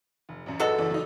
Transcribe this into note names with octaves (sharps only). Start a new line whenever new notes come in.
F1
A1 F#2
F#4 G#4 A4 B4 D#5
F#1 E3 D5
F#3 D#4